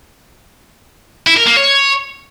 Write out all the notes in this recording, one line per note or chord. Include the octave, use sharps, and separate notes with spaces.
E4
A#4
A#3
C#5